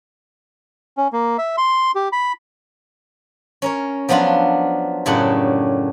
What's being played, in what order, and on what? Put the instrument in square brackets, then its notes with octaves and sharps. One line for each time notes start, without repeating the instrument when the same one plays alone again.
[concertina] C#4
A#3
E5
C6
G4
B5
[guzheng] C#4 A#4 C#5
F3 F#3 B3 D4 F4
F#2 A2 C#3 D4 G4 F#5